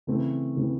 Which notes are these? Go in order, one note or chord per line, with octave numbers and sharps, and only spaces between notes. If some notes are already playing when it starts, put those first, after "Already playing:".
C#3 E3 A3 C4
C#3 E3 A3 C4